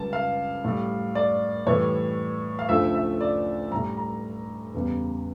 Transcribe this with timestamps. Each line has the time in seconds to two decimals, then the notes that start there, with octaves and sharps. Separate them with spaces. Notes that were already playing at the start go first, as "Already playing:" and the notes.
Already playing: C#2 C#3 G3 A5
0.13 F5
0.64 A2 G3
1.15 D5
1.67 A2 E3 G3 C#5
2.59 F5
2.69 D2 C#3 F3 A3 E5
2.95 E5
3.21 D5
3.71 A2 G3 A#5
3.97 A#5
4.74 E2 C#3 G3